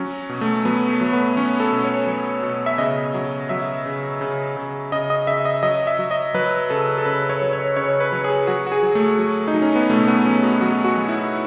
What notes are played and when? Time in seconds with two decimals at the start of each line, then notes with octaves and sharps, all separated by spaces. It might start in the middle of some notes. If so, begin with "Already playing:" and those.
Already playing: F#3 C#4
0.29 B2
0.41 A3
0.65 F#3 B3
0.89 A3
1.01 F#3 A3
1.13 B3
1.36 F#3 C#4
1.60 A4
1.72 B2
1.84 C#5
2.07 F#3
2.43 B2
2.66 E5
2.78 C#3 D#5
3.14 F#3
3.49 F#3 E5
3.86 C#3
4.21 C#3
4.57 C#3
4.92 C#3 D#5
5.10 D#5
5.27 C#3 E5
5.45 D#5
5.63 F#3 D#5
5.87 E5
5.99 F#3
6.11 D#5
6.34 F#3 B4
6.70 C#3 A4
6.98 A4
7.05 C#3 B4
7.30 C#5
7.42 F#3
7.53 C#5
7.77 C#3 C#5
8.00 B4
8.12 F#3
8.24 G#4
8.47 F#3 F#4
8.66 F#4
8.72 G#4
8.83 F#3
8.95 A3
9.19 F#3
9.48 D#4
9.54 F#3
9.62 C#4
9.76 B3
9.90 B2 A3
10.07 B3
10.26 F#3 C#4
10.44 F#4
10.61 F#3 F#4
10.85 F#4
10.97 F#3
11.09 E4